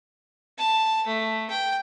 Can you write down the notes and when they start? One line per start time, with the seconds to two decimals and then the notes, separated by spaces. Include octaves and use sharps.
0.58 A5
1.07 A3
1.50 G5